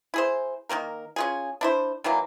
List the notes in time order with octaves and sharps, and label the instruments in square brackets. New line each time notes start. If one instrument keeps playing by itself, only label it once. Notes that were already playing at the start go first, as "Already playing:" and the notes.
[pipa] E4 G#4 C5
D#3 F3 A#3 A#4
C#4 F4 G#4
D4 E4 C5
D#3 E3 F#3 A#3